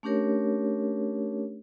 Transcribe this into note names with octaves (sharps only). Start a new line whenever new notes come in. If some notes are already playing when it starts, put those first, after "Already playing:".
A3 C#4 D4 G4 A#4 C#5